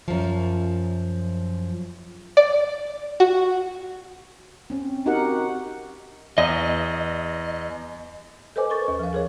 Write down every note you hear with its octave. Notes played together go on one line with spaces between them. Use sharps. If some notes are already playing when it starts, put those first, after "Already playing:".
F#2 F3
D5
F#4
C4 C#4
C4 D#4 F#4 G4 A#4 F#5
E2 D#5
A4 B4 C5 D#5 G#5 D6
A4 A#4 C#6 A6
D#2
F3 F5
G#4 A#4 C#5